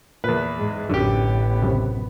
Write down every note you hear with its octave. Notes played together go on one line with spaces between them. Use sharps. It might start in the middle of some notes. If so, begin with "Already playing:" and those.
E2 A#2 B4
G#2 G#3
A1 F#2 D3 B3 G4
C#2 F#2 C3